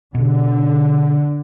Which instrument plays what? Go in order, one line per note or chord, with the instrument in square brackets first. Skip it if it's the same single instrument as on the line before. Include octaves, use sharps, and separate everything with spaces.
[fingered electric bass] B2 [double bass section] D3